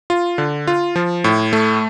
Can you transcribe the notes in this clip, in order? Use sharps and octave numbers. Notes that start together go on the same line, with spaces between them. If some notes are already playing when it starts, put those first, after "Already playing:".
F4
D3
F4
F3
A2
A3